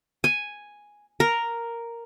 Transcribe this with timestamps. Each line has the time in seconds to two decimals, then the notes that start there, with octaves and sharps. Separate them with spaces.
0.24 G#5
1.20 A#4